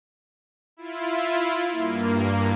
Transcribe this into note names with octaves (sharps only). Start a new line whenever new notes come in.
E4 F4
G2 A#3